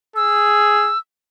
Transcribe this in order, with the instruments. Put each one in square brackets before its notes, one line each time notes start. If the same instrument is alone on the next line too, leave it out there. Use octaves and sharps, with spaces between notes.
[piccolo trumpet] G#4 [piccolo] E6